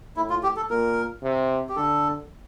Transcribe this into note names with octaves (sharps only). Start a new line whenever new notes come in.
A2 E4
F4
G4
A4
A#2 A#4
C3
G4
D3 A4